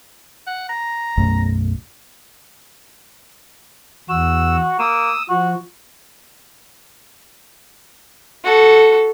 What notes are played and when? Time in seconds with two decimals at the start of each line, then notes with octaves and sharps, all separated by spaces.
0.46 F#5
0.69 A#5
1.17 B1 F#2 A3
4.09 E2 F#4 E6
4.79 A#3 D#6 E6
5.30 F3 F#4
8.44 F#4 A4